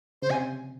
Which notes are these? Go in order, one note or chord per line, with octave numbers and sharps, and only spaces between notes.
C#3 C5
C3 G#5